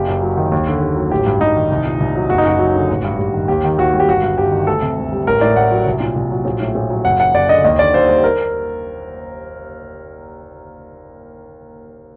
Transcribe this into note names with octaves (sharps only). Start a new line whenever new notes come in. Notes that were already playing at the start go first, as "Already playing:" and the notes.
Already playing: F#1 G4
F#2
F#3
D#3
D#2
D3
D#2
F#3
A1 G4
G2
G3 D#4
D#3
C2
A#2
C2
F#3
F#1 F#4
D#4
F#2 F#4
F#3
D3
A1
G2
G3
D#3
D#2 G4
D#3
D#2 F#4
G3
G4
G1 F#4
G2
G1 G4
D#3
D2 A4
C3
D2
G3
A1 A#4
A2 D5
A1 F#5
F#3
C2
A#2
C2
F#3
A#1
A2
A#1
F#3
F#1 F#5
F#2 F#5
F#1 D5
D3 D#5
D#2 D#5
D3 D5
D#2 C5
G3 C5
A#4